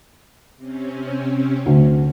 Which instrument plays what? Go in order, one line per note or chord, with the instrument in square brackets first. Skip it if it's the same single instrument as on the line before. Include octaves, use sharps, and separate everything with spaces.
[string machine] C3 C4 C#4
[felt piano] D2